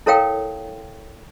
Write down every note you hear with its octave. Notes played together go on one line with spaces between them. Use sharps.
E4 A4 A#4 C#5 F5 G5